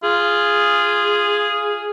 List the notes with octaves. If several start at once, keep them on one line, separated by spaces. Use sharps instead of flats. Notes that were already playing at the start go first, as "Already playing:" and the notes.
F4 G#4